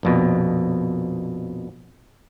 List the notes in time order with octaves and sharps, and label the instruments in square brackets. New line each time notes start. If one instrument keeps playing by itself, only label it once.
[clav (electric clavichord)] A#1 F2 B2